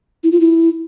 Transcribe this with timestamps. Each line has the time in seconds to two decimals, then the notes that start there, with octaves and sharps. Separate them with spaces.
0.24 E4
0.32 F4
0.40 E4